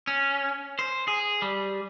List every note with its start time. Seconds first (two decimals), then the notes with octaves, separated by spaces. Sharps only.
0.07 C#4
0.79 C5
1.08 G#4
1.42 G3